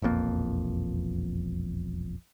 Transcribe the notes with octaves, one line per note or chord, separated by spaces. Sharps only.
E1 A#1 F2 A#3